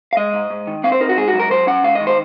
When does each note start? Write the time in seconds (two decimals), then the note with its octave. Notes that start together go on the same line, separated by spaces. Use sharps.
0.13 F5
0.17 G#3 D#5
0.33 G#2
0.50 G#2
0.67 D#3
0.84 C4 F5
0.92 C5
1.00 D#4 A#4
1.09 F#4
1.17 G#2 G#4
1.28 F#4
1.34 F#3
1.39 A#4
1.50 F#3 C5
1.67 C#4 F#5
1.84 G#2 F5
1.95 D#5
2.00 D#3
2.07 C5